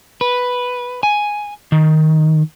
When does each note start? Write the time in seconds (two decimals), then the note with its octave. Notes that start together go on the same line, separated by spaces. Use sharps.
0.21 B4
1.03 G#5
1.72 D#3